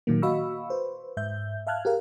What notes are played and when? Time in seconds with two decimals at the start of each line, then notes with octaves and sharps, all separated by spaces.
0.07 A#2 D#3 F#3 A#3
0.22 F#4 D#5 F5 B5 C#6 E6
0.70 B4 C5
1.17 G#2 E5 G6
1.67 E5 F5 A5 F6 F#6 G#6
1.85 G4 G#4 A#4 F5